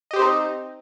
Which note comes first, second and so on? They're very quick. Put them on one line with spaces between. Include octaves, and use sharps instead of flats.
D#5 G4 C5 C4 D#4